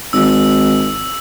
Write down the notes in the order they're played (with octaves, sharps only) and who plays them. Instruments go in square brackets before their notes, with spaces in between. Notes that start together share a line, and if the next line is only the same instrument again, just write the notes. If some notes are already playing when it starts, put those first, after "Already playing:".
[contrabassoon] G#1 [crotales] E6